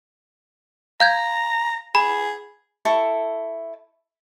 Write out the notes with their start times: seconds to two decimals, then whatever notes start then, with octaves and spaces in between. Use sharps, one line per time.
1.00 F5 A#5 G6 G#6
1.95 G#4 B5
2.85 E4 A4 C#6